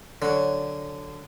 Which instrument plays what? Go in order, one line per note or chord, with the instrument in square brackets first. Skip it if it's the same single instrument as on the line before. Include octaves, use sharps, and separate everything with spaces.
[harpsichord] D3 [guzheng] F#3 C#5